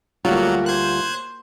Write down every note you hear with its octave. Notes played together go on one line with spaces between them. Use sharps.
D2 F#3 G3 A#3 F4 F#4
C5 F#6 G#6